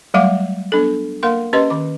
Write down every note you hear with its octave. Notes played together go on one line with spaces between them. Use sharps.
F#3 G3 A3 F5 F#5 D6
B3 D4 A4
A#3 A#4 F5 C6
C#4 G4 B4 D#5 C6
D#3 D6